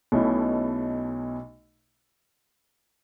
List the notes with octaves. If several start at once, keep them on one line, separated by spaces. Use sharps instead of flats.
B1 B2 A3 C#4 E4